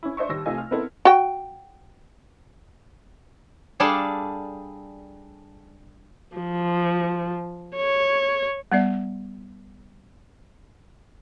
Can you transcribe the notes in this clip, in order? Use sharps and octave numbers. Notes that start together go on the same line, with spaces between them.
C#4 E4
D4 C5 D#5 E5 C#6
D#2 G3 E6 A#6
C3 A3 F4 D#5 G#5
F6
B3 C4 D#4 E4 A4 A#4
F#4 G5
G3 D4 G#4 A4 D5 F5
F3
C#5
G3 B3 D5 E5